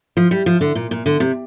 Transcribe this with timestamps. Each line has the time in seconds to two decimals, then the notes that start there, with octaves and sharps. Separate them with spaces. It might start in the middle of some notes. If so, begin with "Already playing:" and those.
0.17 F3
0.31 G3
0.46 F3
0.61 D3
0.75 A#2
0.91 A#2
1.06 D3
1.20 C3